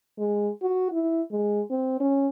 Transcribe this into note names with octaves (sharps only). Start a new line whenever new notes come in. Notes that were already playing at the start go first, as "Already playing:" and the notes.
G#3
F#4
E4
G#3
C4
C#4